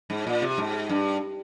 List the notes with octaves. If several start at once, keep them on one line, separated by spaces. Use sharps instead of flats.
G#2
A#2
C3
G#2
G2